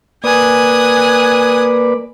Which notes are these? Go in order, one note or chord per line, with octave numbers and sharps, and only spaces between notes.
A#3 B4 D5 G#5 D#6 F#6